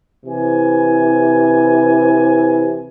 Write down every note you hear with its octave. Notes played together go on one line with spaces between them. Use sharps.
C3 E3 G#5